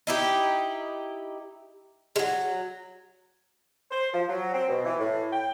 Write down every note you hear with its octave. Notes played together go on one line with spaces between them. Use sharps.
D#4 E4 G4
F#3 G#3
C5
F3
F#3
C4
B2
E3
A2
G5